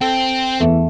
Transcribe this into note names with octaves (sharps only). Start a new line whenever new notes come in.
C4 A4 G5
E2 E3 A3